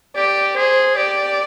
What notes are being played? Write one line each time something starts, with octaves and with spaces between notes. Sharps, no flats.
G4 D5
G#4 C5
G4 D5